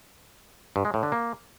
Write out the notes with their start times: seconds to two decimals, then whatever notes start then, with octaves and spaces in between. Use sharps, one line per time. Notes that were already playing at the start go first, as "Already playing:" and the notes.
0.76 G2
0.85 G#3
0.94 A2
1.03 D3
1.12 A#3